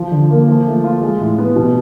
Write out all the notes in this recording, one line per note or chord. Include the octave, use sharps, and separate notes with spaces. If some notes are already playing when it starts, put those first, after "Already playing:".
Already playing: F3
D3
A#3
F3
A3
F4
G#3
A2
B3
B2